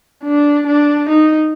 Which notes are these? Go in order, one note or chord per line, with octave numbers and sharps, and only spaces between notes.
D4
D4
D#4